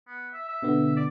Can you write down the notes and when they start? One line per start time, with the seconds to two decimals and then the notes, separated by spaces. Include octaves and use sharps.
0.07 B3
0.33 E5
0.48 E5
0.63 B2 D3 B3
0.96 D5